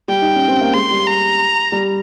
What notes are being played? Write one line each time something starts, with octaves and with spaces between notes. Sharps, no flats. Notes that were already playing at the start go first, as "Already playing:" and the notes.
G3 G5
D#4
C#4
C4
A#3
G#3 C6
G3
A#5
G3